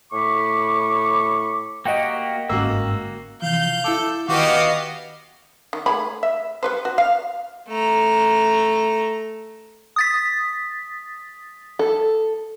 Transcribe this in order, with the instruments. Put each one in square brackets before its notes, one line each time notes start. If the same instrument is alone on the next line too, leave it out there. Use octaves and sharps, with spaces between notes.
[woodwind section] A2 B5 C#6 D6
[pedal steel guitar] A#3 F#4 G4 [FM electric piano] D#5 F#5 G5
[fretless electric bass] G1 G#2 C#4 [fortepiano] A#3 F#4 [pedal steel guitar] E6
[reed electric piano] C3 E3 F3 [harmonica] F5 [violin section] G6
[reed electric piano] E4 D6 [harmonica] A4
[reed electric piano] D#3 [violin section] B3 D#5 F5 [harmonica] F#4 G4 D6
[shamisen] D#3
A3 G#4 B5
E5
G3 B4 C5
F#4
F5
[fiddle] A3 A#5
[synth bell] D#6 A6 B6
[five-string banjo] A4